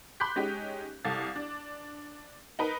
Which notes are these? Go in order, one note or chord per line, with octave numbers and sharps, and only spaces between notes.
B5 C6 D6 F#6 G6 B6
G#3 C#4 D#4 G4
C2 A4 F5 A6
D4
D#4 A#4 B4